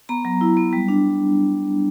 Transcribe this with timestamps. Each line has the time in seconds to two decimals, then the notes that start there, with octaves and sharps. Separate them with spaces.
0.09 B3 A#5
0.25 F#3
0.41 E4
0.57 B3
0.73 G3
0.88 D4